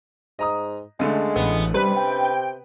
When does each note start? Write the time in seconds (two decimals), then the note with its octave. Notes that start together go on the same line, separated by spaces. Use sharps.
0.39 G#2 D#5 A#5 D#6
0.99 C#2 D3 G#3 A3
1.36 A1 B3
1.74 C3 G3 B4
1.96 G5